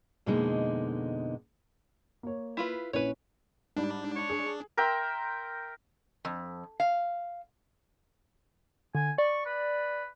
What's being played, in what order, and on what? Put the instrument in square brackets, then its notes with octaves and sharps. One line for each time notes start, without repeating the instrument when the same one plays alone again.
[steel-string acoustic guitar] F2 B2 D3 G#3 A#3 D#4
[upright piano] A#3 C#5
[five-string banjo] E4 F4 B4
[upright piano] A#1 C#4 E4 [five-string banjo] B4 C#5
[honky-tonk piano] G#2 G3 [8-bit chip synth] D4
[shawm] C#5
[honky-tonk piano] G#4
[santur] A#4 E5 G5 C6
[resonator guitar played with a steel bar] F2
F5
[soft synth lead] D3 [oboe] G#5
[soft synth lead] D5 [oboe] C#6
[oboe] B4